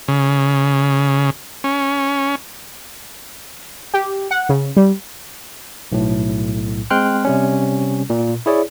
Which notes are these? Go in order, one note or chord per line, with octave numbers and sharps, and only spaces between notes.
C#3
C#4
G4
F#5
C#3
G3
B1 A2
G#3 C4 G5 C6 F6 F#6
C3 G3 C#4
A#2
E4 G#4 C#5 D5